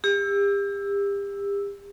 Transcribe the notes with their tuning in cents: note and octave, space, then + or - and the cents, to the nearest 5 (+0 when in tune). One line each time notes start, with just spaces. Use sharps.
G4 +35 E6 +0